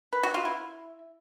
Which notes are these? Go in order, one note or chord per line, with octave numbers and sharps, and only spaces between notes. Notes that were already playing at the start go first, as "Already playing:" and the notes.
B4
F#4
F4
E4